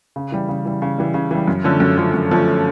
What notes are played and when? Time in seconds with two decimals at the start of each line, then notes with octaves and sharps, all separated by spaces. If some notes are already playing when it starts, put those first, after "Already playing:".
0.16 C#3
0.32 E3 G3
0.49 C#3
0.65 E3 G3
0.82 C#3
0.98 E3 G3
1.14 C#3
1.31 E3 G3
1.48 F#2
1.64 D3 F3 A3 C#4
1.80 F#2
1.98 D3 F3 A3 C#4
2.14 F#2
2.31 D3 F3 A3 C#4